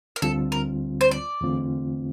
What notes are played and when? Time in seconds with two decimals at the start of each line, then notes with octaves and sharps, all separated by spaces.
0.16 A#4
0.22 D2 D3 G3 C4 F4 A4
0.52 A#4
1.01 C5
1.11 D5
1.41 E2 D3 A3 C4 F4